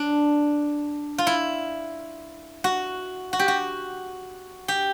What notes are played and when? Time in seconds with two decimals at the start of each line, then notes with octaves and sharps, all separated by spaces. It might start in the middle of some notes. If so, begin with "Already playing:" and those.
Already playing: D4
1.18 F4
1.27 E4
2.64 F#4
3.33 F#4
3.39 G4
3.48 F#4
4.68 G4